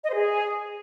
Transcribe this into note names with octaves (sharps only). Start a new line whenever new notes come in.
D#5
C5
G#4